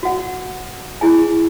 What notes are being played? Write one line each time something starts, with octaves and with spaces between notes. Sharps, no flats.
F#4 F#5
E4 G#4 G#5